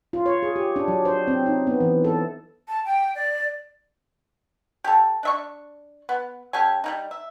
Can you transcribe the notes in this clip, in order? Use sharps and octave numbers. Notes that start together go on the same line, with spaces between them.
F4
C#5
G#4
G4
D4
F#3
C5
C4
D#4
B3
E3
A4
A5
G5
D5
G4 A4
D4 E5 C#6
B3
C#4 G4 A4 G#5
G3 A#3 D#4
E5